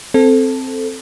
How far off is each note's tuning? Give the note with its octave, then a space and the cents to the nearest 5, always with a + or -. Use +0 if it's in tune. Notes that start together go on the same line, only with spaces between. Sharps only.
C4 +0 A4 +0